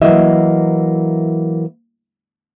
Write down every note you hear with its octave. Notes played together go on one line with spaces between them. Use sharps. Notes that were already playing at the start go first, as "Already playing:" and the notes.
E3 F#3 A#3 E4 D#5 E5